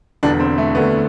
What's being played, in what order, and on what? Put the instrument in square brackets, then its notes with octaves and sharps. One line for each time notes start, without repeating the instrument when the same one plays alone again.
[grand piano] E1 E2 D3 G3 [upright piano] D4
[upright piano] C4
A3
[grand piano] D2 D3 A3 [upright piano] B3